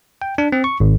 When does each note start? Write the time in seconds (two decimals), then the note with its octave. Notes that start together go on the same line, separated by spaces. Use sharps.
0.22 G5
0.38 D4
0.52 C4
0.64 C#6
0.80 G#1